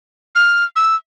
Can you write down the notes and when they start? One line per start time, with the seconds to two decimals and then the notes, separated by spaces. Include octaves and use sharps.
0.35 F6
0.76 E6